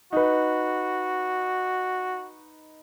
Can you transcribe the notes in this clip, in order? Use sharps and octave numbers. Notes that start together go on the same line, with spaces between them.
D#4 F#4 B4